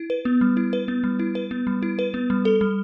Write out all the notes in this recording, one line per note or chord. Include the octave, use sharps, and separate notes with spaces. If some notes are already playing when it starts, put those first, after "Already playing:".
Already playing: E4
B4
B3
G3
E4
B4
B3
G3
E4
B4
B3
G3
E4
B4
B3
G3
A4
G3